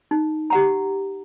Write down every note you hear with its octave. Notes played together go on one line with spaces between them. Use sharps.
D#4
G4 F#5 A#5